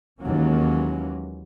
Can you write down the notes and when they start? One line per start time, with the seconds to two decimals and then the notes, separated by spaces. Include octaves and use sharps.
0.21 D#2 E3 F#3 G#3 A#3 C#4